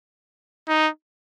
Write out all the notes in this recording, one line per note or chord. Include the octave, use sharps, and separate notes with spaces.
D#4